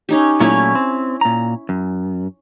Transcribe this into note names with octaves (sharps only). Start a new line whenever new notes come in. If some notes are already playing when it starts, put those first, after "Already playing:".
C#4 D#4 G4
A#2 F#3 A3 C#4 E4 F5
C4
A#2 A#5
F#2